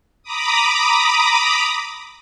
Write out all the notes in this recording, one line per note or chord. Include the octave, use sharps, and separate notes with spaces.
A#5 B5 D6 D#6